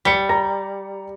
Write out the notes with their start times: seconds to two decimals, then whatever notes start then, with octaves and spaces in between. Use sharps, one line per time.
0.05 G3 B6 C#7
0.29 A#5 A#6